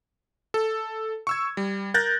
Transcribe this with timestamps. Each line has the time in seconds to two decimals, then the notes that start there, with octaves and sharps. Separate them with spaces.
0.54 A4
1.27 C#6 E6 G#6
1.57 G3
1.94 A#4 F#6 G6 A6 A#6